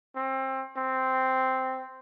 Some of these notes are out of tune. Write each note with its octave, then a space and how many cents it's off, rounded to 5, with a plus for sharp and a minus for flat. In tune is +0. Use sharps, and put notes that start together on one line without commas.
C4 +25
C4 -5